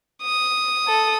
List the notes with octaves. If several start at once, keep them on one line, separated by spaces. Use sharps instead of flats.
D#6
A4